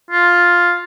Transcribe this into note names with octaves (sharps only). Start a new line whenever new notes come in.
F4